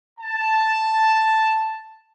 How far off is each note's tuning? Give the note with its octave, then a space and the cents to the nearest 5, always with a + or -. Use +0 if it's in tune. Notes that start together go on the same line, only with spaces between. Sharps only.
A5 +0